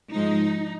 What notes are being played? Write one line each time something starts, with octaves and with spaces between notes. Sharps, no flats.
G#2 F3 G#3 D#4